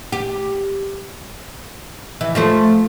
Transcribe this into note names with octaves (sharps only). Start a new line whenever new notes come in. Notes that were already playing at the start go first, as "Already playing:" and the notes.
G4
E3
F3 A3 C5